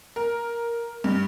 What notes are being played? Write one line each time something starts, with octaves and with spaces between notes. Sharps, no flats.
A#4
G2